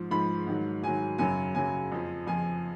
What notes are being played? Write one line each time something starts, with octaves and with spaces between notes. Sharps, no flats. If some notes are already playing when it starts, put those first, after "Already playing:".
Already playing: G#2 F3
G#2 F3 B5
G#2 D#3 F#3
G#2 D#3 F#3 G#5
F#2 C#3 F#3 G#5
F#2 C#3 F#3 G#5
F2 F3
F2 F3 G#5